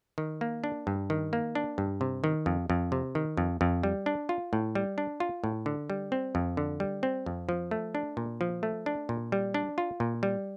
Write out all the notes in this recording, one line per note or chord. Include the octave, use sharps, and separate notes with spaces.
D#3
A#3
D4
G2
D#3
A#3
D4
G2
C3
D#3
F2
F2
C3
D#3
F2
F2
G3
D4
F4
A2
G3
D4
F4
A2
D3
G3
C4
F2
D3
G3
C4
F2
F3
A3
D4
A#2
F3
A3
D4
A#2
G3
D4
F4
A#2
G3